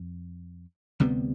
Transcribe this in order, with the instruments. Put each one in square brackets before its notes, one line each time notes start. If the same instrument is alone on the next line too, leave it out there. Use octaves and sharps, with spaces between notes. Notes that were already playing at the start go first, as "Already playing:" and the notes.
Already playing: [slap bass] F2
D2 C3 G3 B3